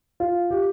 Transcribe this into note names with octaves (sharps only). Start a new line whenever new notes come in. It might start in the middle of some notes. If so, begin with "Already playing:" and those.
F4
G4